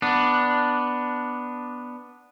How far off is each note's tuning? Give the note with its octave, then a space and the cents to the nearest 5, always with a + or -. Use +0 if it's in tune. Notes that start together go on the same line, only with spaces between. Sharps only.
B3 +0 D4 +0